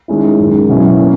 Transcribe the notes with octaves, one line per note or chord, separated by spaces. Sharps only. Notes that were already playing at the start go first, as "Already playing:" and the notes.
D#3 G#3 C#4 E4
F#2 D#3 G#3
B2 F#3 C#4 E4
A#3 C#4